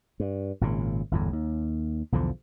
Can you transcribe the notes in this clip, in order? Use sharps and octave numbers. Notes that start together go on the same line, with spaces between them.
G2
G#1 A#2 C#3
G1 E2 A2
D#2
B1 E2 D3 F3